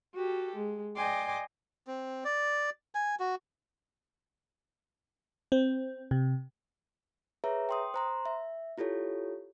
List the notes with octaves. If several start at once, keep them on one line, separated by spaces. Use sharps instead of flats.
F#4 G4 A4
G#3
D5 D#5 G5 G#5 C6 D6
C4
D5
G#5
F#4
C4
C3
G#4 B4 C#5 E5 A#5
G5 C6 D#6
C5 A#5 C6
E5
E4 F4 G4 A4 C#5